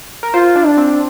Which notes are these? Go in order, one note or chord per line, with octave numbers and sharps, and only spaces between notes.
A#4
F4 C5
D4
D4
C4